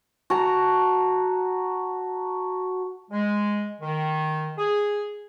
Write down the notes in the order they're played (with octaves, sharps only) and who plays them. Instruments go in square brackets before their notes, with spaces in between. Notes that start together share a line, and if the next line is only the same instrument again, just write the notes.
[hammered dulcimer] F#4 A5 A#5
[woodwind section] G#3
D#3
G#4